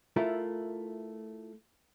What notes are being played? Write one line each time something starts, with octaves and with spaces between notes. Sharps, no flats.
A3 E4 F4 A#4